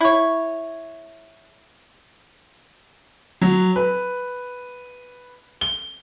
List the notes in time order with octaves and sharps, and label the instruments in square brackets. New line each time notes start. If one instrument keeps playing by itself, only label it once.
[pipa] E4 C#5
[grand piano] F#3
B4
G7